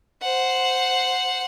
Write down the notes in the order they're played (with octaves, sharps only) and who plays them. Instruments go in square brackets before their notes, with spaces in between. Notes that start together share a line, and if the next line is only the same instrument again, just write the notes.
[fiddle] C5 F#5